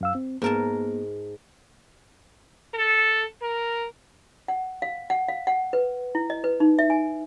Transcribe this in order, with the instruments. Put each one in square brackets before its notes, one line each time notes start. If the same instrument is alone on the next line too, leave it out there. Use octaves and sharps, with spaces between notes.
[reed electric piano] F#2 F5 E6
C4
[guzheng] G#2 A#4 A5 [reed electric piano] A#3 B3
[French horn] A4
A#4
[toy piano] F#5
F5
F#5
F5
F#5
B4
E4
D#5
B4
D#4
E5
G#5